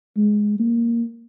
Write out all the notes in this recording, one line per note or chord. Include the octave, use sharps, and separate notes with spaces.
G#3
A#3